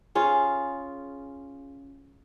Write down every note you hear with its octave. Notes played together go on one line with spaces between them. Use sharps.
C#4 F4 G#4